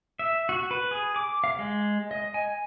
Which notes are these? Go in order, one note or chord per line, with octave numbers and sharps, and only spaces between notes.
E5
F#4
B4
G#4
D6
F5
G#3
D#5
G#5